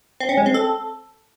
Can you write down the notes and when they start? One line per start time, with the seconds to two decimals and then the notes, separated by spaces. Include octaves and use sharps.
0.20 C4
0.29 C#4
0.37 G#3
0.46 C4
0.54 A4